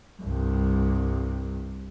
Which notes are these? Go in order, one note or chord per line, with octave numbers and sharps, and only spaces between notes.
C2 G2